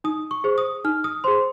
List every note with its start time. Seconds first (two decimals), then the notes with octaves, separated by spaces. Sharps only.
0.04 D#4 D#6
0.31 C#6
0.44 G#4 C5
0.58 D#6
0.84 D#4 F6
1.04 D#6
1.24 G#4 C5 C6